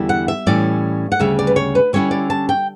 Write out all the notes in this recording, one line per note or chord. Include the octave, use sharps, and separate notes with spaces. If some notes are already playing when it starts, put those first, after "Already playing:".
Already playing: E2 D3 G3 C#4 E4
F#5
E5
A2 E3 G3 C#4 D5
F#5
D2 C#3 G3 C#4 E5
D5
B4
C#5
B4
D3 G3 C#4 E4 C#5
D5
A5
G5